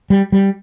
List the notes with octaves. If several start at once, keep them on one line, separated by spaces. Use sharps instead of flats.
G3
G3